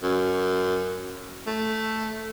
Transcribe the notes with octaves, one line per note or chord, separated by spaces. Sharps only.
F#2
A3